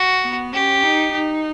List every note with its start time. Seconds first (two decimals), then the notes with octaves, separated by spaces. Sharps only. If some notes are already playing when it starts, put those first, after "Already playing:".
Already playing: F#4
0.23 B3
0.53 C#4 G4
0.82 D#4
1.12 D#4